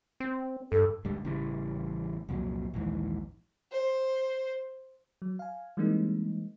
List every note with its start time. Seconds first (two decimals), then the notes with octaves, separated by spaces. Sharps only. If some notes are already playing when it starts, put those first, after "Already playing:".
0.20 C4
0.72 G2 A4
1.05 D2 G#2 G3
1.25 A1 C#3 E3 G3
2.29 C2 F2 A#2 F#3
2.74 A#1 D#2 G#2 E3
3.71 C5
5.22 F#3
5.39 F5 G#5
5.77 E3 G3 G#3 A#3 C4 D#4